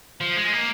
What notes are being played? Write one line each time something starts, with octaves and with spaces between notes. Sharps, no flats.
F3
G#3
A#3